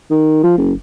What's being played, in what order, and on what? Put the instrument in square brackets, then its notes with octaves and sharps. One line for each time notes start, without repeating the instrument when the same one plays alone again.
[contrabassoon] D#3
F3
F#1